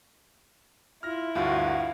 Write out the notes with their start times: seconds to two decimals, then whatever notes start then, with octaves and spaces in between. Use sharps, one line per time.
1.03 E4 F4 F6 A#6
1.35 D2 G2 F4 F#4 F5